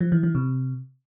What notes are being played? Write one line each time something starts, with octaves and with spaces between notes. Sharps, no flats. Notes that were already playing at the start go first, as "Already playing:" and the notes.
F3
E3
E3
C3